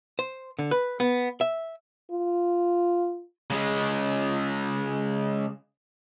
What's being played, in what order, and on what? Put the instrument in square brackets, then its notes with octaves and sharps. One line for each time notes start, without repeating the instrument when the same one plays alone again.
[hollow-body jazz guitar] C5
D3
B4
B3
E5
[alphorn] F4
[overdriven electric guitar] C#3 G#3